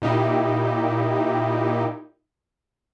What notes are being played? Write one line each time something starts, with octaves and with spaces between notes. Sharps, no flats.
A#2 D#4 E4 G4